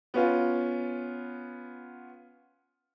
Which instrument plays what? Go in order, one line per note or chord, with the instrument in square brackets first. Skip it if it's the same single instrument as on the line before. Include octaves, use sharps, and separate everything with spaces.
[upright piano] B3 C#4 F4